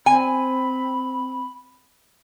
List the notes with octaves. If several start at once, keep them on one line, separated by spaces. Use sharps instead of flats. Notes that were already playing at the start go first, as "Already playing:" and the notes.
C4 G#5 B5